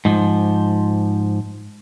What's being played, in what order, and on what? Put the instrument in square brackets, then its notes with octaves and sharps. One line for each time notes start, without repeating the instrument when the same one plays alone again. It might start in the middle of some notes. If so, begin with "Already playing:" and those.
[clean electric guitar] G#2 F3